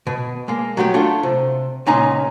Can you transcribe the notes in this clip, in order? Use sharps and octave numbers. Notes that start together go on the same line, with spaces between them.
B2
G#3 A#3
F#3 A3 B3 D#4 G4
A3 D4 F4 A4
C3
C#2 A#2 C#4 D#4 A#5 C6